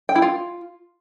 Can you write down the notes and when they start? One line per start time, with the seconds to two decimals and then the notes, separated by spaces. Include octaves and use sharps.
0.09 G5
0.16 E4
0.22 F4